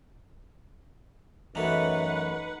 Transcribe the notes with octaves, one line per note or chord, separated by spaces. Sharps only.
F#2 E3 A3 D#4 B4 F#5